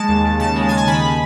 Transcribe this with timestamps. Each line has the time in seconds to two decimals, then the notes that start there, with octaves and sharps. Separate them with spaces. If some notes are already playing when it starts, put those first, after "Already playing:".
Already playing: G#3 A5
0.08 D#2
0.24 D#2
0.40 C#3 A5
0.56 G#3
0.68 D#2 G#5
0.78 A5
0.87 D#3 B5